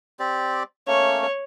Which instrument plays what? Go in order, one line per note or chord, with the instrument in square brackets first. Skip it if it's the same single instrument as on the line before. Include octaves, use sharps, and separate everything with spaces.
[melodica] C4 G4 D5
[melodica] A3 A#3 C#4 [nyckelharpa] C#5